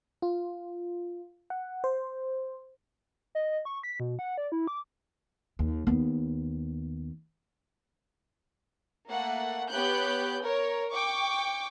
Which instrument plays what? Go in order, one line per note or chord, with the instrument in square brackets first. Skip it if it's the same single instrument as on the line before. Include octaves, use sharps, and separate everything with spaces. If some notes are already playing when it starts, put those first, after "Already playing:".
[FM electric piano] F4
F#5
C5
[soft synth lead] D#5
C#6
B6
B2
F#5
D5
E4
D6
[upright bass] D#2
D#2 B3
[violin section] A3 A#3 F#5
B3 G4 C#5 F#6 G6
A#4 C#5
G5 C#6 D6